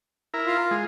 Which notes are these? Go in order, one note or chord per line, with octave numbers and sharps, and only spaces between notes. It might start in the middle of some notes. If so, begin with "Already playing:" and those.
E4 A#4
F4
G#3